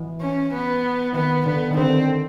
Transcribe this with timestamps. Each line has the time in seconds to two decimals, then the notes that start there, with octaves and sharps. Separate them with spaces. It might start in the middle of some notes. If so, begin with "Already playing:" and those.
Already playing: E3
0.21 C#4
0.53 B3
1.14 D#3 B3
1.46 D3 B3
1.71 D#3
1.76 D3 C4